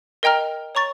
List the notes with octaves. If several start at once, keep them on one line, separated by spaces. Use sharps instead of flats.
A#4 D#5 G5 A#5 F6
C#5 A#5 C#6 A6